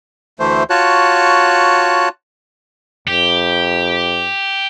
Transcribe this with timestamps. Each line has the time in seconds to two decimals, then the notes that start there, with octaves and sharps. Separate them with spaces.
0.40 D2 E3 A3 C5
0.70 F4 F#4 C#5 A5 F#6
3.08 F2 G4